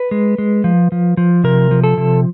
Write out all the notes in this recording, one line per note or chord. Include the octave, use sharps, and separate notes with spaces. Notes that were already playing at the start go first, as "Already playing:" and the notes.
Already playing: B4
G#3
G#3
F3
F3
F3
C3 A#4
F3
A4
C3